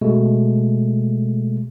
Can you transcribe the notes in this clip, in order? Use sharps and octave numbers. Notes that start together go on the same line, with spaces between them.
B2 G#3 A3